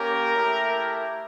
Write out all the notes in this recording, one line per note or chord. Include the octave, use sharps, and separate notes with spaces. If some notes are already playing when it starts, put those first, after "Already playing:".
Already playing: A#3 C#4 G4 A#4
A3 E4 G4